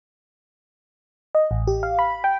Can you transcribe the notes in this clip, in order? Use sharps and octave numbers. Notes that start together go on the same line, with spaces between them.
D#5
A1
G4
F5
B5
G5